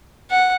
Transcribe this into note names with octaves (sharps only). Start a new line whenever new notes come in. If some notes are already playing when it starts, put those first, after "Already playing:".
F#5